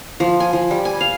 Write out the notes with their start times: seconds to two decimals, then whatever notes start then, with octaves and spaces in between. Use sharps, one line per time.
0.20 F3
0.40 G#5
0.53 F3
0.71 G3
0.85 G#5
1.01 F5